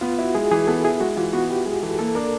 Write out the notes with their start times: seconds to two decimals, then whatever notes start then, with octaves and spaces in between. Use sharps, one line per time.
0.01 B3 F4
0.18 E4 F#4
0.35 G#3 G#4
0.51 E3 G#4
0.67 B3 A4
0.84 E4 G#4
1.00 G#3 F#4
1.17 E3 F4
1.33 B3 F#4
1.50 E4 G4
1.66 G#3 G#4
1.83 E3 A4
1.99 A#3 A4
2.15 D4 A#4